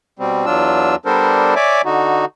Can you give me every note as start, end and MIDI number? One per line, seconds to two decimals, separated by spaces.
0.19 0.46 47
0.19 0.46 55
0.19 0.46 60
0.46 0.96 40
0.46 0.96 54
0.46 0.96 62
0.46 0.96 65
0.46 0.96 88
1.06 1.55 55
1.06 1.55 59
1.06 1.55 62
1.06 1.55 69
1.06 1.55 70
1.06 1.55 72
1.56 1.82 73
1.56 1.82 74
1.56 1.82 76
1.56 1.82 80
1.56 1.82 86
1.85 2.25 50
1.85 2.25 63
1.85 2.25 66